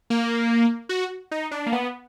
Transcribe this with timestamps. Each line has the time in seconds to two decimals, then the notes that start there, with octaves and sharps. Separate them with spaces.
0.10 A#3
0.89 F#4
1.31 D#4
1.51 D4
1.66 A#3
1.72 B3